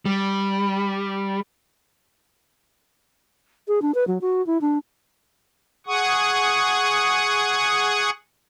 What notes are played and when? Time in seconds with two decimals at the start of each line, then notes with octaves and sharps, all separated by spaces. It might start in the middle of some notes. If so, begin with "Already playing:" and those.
0.06 G3
3.68 G#4
3.82 D4
3.95 B4
4.07 F#3
4.21 F#4
4.47 E4
4.61 D4
5.87 G#4 F#5 C#6 D#6